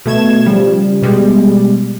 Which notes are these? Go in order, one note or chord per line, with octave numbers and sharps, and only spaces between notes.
B2 A3 G#6 E7
C#3 F3 G3
B2 G3 G#3